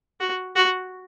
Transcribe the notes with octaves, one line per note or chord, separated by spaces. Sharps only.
F#4
F#4